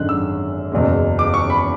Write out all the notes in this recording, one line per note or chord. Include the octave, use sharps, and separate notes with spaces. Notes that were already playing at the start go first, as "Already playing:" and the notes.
Already playing: G#1 F#2 D3 G#3 F#6
E6
F#1 E2 B2 G#3
D6
C#6
B5